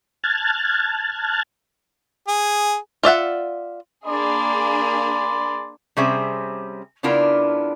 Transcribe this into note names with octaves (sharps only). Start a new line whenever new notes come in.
A5 F6 F#6 G#6 A6
G#4
F4 D5 E5 F#5
A#3 D4 G#4 D5 B5 C6
C3 G3 C#4 G#4 C5 E5
C#3 B3 D4 E4 F4 A#4